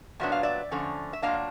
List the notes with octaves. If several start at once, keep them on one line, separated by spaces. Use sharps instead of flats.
A#2 F#3 B3 D4 E5
F5
D5 E5
D3 F3 A3 C#4
E5
A#2 F#3 A#3 D4 D#5 F5